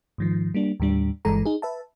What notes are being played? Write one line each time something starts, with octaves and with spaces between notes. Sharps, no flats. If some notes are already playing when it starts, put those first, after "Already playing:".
G#2 D#3 F3
G3 A#3 D4
D#2 A2 G3 D4
G1 G2 E3 G#3 A4 A#5
D#4 G#4
B4 E5 A5